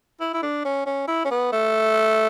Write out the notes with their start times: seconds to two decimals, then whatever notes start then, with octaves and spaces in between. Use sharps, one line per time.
0.20 E4
0.33 E4
0.43 D4
0.65 C#4
0.86 C#4
1.08 E4
1.25 C#4
1.31 B3
1.52 A3